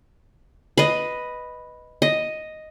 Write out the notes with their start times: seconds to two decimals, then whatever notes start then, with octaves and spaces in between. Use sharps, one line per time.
0.78 B4 D#5
2.02 D#5